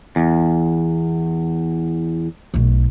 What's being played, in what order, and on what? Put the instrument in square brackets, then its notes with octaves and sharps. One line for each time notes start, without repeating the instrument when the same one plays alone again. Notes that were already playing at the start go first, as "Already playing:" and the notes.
[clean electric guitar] E2
[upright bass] B1 A3